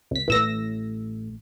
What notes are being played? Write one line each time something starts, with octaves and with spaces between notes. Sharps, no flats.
C#2 B6
A1 A2 E3 A3 E6 A#6